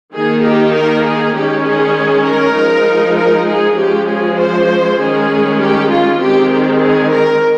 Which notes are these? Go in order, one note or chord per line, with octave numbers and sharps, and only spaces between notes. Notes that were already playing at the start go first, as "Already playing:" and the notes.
D#3 A#3 D#4 G#4
G4
A#4
G#4
D#3 G#3 C#4 G4
G#4
A#4
F3 G#3 D#4
A#4
G#4
F3 G#3 C#4 G4
G#4
C5
D#3 G#3 C#4 G#4
G4
F4
D#3 G#3 C4 G4
G4
G#4
A#4